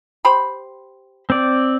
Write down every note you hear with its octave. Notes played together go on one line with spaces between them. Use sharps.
G4 C5 B5
C4 D5